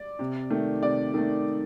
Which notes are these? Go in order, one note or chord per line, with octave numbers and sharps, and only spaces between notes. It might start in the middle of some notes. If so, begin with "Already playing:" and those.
Already playing: D5
C3
D#3 A3
C3 D5
D#3 A3